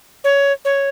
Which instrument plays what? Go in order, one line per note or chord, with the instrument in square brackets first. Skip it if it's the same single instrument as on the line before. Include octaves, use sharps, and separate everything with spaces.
[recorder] C#5
C#5